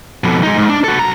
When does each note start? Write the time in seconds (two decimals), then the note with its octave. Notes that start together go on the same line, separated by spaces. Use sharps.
0.24 F2 B2
0.43 G#3 D#4
0.57 G#2
0.69 D4
0.84 F#4 A4
0.99 B1 A#5